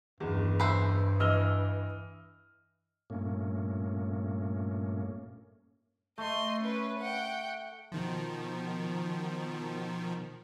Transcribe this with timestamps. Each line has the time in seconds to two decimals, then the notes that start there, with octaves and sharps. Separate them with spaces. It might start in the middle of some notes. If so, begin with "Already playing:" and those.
0.20 F#1 E2 G2
0.60 B4 C5 E5
1.20 E3 D#5 E6 F6 G7
3.10 G2 A#2 A3 A#3 C#4
6.18 A3 D#5 C6
6.60 C#4 B4
7.00 F#5 G5
7.92 B2 D#3 F3